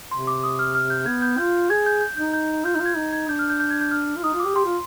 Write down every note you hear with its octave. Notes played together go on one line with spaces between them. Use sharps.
C3 C6
D6
D#6
F6
F6
G6
B3 G#6
G6
F4 G6
G#4 G#6
G6
G6
D#4 G6
G6
F4 G6
D#4 G6
F4
G#6
D#4
G#6
D4 G6
F6
G6
G6
G#6
G6
F6
F4
D#4 D#6
F4
G4 D6
G4 C6
F4